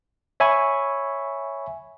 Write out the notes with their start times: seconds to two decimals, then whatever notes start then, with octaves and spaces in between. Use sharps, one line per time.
0.40 C#5 E5 G#5 B5 C#6